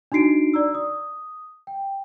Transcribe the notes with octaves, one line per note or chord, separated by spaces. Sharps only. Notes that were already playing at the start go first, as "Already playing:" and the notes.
D4 D#4 F#4 C7 D7
D5 A#5 E6
D#6
G5